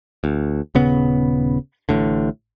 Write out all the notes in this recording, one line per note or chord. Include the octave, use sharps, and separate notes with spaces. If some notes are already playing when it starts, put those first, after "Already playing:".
D2
D#1 C#3 B3
A1 A2 D3